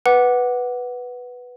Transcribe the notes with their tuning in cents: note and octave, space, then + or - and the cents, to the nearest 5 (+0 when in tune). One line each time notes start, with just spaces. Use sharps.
B4 +0 F#5 +0 D6 +0